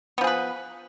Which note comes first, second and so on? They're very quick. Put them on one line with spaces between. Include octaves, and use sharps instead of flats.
B3 F3 G#4 B4